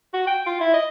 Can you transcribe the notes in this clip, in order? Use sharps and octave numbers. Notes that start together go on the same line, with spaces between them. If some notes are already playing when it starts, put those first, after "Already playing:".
F#4
G5
F4
E4
D#5